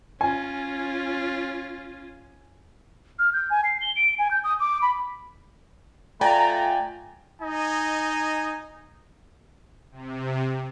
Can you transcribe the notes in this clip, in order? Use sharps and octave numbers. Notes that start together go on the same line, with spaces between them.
C#4 F4 G#5
F6
G6
G#5
C7
G7
D7
G#5
G6
D#6
D6
B5
A3 F4 D5 G5 G#5 A#5
D#4 D#5 G#5
C3